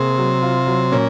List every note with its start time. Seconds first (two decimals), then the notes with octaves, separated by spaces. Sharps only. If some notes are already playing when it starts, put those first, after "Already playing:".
Already playing: C3 A#3 G#4
0.18 F#3
0.42 F4
0.67 F#3
0.92 A#2 C#4